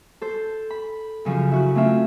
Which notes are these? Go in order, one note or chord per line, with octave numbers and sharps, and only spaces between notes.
A4 C5
B5
F#2 C#3 F3
E4 F#4 F#6
A3 C4 C#4 F4 E5